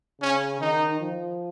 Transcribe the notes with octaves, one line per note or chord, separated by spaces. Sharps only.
C#3 C#4
D#3 D#4
F3